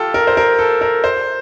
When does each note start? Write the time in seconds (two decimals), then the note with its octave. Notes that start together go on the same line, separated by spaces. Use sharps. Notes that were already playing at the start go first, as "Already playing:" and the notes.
Already playing: F4 G4 A4
0.14 A#4
0.27 C5
0.37 A#4
0.59 A4
0.81 A#4
1.04 C5